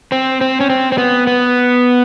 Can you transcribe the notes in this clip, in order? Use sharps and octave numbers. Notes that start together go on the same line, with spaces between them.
C4
C4
C#4
C4
C4
B3
B3